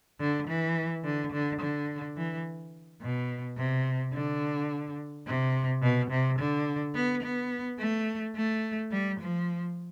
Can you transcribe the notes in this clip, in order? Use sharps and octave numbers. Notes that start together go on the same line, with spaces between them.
D3
E3
D3
D3
D3
E3
B2
C3
D3
C3
B2
C3
D3
B3
B3
A3
A3
G3
F3